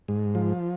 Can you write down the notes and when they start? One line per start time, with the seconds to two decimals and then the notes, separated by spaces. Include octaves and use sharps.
0.08 G#2
0.35 F3